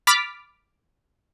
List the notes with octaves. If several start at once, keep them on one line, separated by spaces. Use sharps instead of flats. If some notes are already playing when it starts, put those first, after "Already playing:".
B5 D6 F6 A6 B6